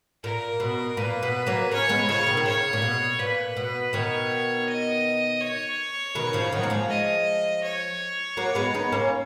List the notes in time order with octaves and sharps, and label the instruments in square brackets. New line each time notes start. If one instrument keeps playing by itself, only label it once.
[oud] A#2 [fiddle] A#4
[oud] B2
[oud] A#2 [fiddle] B4
[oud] B2
F#3 A#3
[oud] A#3 C#4 [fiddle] C#5
[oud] G#3 B3
[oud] C#3 F3 [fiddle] C#5
[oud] B2 D#3
D#3
[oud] C#3 [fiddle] C#5
[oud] A#2
B2
[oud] A#2 [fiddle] B4
[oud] B2
[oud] B2 D#3 [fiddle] C#5
[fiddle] D#5
C#5
[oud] B2 D#3
C#3 F3
D#3 F#3
A#3
F3 G#3
[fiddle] D#5
C#5
[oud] F#3 A#3
G#3 B3
B3 D#4
A#3 C#4